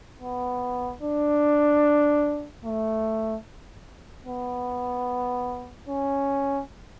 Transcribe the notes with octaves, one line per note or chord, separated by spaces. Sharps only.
B3
D4
A3
B3
C#4